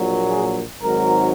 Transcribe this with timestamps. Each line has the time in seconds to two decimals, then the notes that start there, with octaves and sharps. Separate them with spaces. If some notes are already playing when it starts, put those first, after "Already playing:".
Already playing: A#1 A#2 F#3
0.29 G#4
0.82 G#1 G#2 F#3 A#4